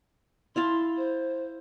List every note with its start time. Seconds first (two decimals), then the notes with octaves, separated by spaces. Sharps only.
0.56 E4 F5 A5 C6
0.97 C5